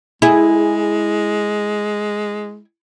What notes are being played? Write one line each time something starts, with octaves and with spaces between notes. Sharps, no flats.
G#3 E4 G#4